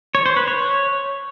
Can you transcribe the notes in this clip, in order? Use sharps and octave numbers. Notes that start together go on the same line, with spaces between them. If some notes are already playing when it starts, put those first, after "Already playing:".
C#5
C5
B4
C#5